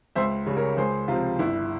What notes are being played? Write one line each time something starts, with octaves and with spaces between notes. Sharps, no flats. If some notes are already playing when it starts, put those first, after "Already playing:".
C#2 C5 E5
C#3 G3
A#4 C#5
C#2 G#4 C5
C3 F3 F4
G1 E4